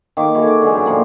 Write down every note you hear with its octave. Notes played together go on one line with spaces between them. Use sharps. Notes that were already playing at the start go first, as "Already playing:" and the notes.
D#3 A#3 F5 D6
E4 F#4 G#4 A4
D6
D3 E3 G#3
F#2 G5
A#2 F3 A#3